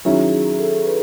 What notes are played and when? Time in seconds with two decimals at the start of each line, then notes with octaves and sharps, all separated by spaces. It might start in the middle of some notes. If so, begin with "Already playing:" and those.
0.05 D#3 F#3 C#4 E4 G#4
0.32 G#4
0.59 A4
0.85 B4